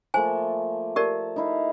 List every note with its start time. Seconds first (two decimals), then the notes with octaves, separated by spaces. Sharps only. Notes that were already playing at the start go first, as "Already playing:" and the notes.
0.14 F3 A3 A#3 C5 G#5
0.96 G4 A#4 D5 A5
1.36 D#4 E4 F5